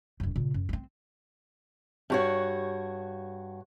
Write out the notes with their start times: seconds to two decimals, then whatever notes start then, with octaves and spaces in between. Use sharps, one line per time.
0.20 E1 F#2
0.36 A#2 C#3
0.54 F#2
0.69 G#3 C4
2.10 G2 F#4 C#5